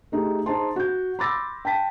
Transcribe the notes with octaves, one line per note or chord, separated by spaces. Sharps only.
A3 D#4 G4 G#4
D#4 G#4 C5 A5 C6
F#4 G6
B5 C6 D6 E6 A6 A#6
G5 A5 B6